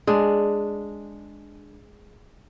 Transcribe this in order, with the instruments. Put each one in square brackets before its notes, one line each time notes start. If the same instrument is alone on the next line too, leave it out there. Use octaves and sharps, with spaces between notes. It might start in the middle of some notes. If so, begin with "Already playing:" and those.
[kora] G#3 D4